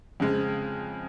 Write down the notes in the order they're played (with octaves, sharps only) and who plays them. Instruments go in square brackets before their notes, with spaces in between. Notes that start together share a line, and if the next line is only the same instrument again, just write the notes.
[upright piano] F2 C#3 G#3 C4